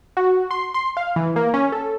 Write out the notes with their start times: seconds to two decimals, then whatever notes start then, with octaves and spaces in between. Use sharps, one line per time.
0.17 F#4
0.51 C6
0.74 C6
0.97 F5
1.16 E3
1.36 A#3
1.54 C#4
1.72 A4